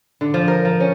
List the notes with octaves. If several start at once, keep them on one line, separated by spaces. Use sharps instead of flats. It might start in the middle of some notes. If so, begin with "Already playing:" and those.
D3
F3
A#4
F3
C#4